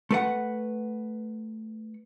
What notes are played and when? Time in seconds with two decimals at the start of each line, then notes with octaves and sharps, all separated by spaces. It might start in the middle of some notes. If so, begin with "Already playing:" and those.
0.11 A3 B4 F#5